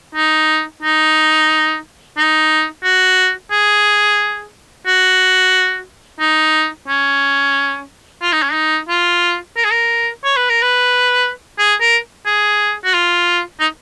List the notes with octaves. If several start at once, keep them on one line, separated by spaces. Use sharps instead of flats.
D#4
D#4
D#4
F#4
G#4
F#4
D#4
C#4
F4
D#4
C#4
D#4
F4
A#4
G#4
A#4
C#5
B4
A#4
B4
G#4
A#4
G#4
F#4
F4
D#4